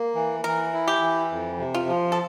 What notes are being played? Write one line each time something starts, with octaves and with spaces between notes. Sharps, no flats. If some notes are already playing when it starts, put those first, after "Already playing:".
Already playing: A#3
E3
E3 A#4
E4
G4
E3
F2
C3
F4
F3
A4